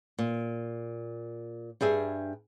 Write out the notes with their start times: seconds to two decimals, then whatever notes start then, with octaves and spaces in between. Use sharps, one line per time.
0.19 A#2
1.81 G2 G3 G#4 E5